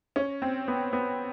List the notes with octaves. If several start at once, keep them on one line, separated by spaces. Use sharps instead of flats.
C#4
C4
B3
B3